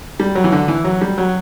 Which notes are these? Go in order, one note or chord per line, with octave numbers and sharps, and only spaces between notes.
G3
F#3
E3
D3
E3
F#3
G3
F#3